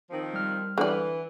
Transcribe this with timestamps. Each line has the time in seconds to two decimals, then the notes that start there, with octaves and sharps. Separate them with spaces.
0.10 D#3 F3 C4
0.34 G3 F6
0.78 D3 E3 D5